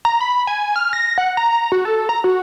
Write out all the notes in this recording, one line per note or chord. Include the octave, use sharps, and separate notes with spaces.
A#5
B5
G#5
F6
A#6
F#5
A#5
F#4
A4
A#5
F#4